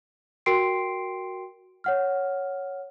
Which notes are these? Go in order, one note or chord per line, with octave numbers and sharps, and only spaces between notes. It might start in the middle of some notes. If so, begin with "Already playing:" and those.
F#4 A#4 G5 C6 C7 D7
C#5 F#5 F6